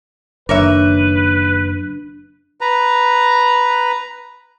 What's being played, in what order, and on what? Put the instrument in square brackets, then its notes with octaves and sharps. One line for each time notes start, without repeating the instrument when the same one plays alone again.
[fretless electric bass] F#1 D#3 [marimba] D4 [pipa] A#4 C#5 E5 [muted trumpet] B4
[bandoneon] B4 A#5